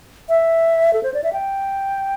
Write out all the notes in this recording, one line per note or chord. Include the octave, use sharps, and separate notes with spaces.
E5
A4
C5
D5
E5
G5